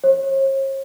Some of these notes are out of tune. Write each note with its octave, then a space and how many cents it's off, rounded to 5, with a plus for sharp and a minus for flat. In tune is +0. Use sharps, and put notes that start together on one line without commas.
C#5 -45